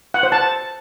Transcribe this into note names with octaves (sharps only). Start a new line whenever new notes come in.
F#5
C5
A5